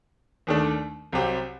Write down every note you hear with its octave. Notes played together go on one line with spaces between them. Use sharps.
D#2 D#3 A3 D4
C2 C3 F#3 C4 G4